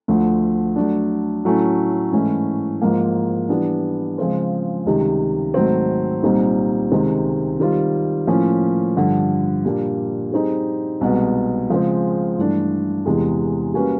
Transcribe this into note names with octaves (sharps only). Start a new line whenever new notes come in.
D2 D3 F3 A3
F#3 A3 D4
A2 F#3 A3 C#4 E4
G#2 E3 A3 C#4 E4
G#2 F3 A#3
E3 G3 B3 D4
C#3 F3 G#3 C4 F4
C#2 C3 D#3 G3
G#2 D#3 F#3 A3 C4
C2 A#2 G3 C4 D#4
C#2 C3 D#3 G#3 C4
D#3 G3 C4 F4
A2 F3 A#3 C#4
G2 D3 F3
A#2 G3 A#3 D4
G3 C4 D#4 G#4
C2 B2 G#3 B3
C#3 F3 G#3 C4
G2 E3 A3 D4
E2 C3 E3 G#3
G3 A#3 C#4 F#4 B4